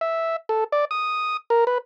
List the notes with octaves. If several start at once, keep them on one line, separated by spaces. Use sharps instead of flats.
E5
A4
D5
D#6
A#4
B4